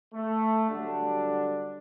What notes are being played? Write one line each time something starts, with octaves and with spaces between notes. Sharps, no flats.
A3
D3 F#3 G3 D4